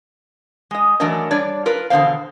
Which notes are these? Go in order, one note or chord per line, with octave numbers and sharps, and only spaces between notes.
G#3 D#5
E3 F#3 A3 D4 A#4 D#5
G3 D4 C#5 D5
F4 A#4 B4
E2 B2 D3 A#3 C5 F5